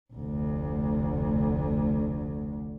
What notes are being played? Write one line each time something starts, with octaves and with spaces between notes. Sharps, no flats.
F1 D2